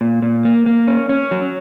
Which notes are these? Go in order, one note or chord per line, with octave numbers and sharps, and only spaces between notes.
A#2
A#2
A#3
A#3
C#4
C#4
F#3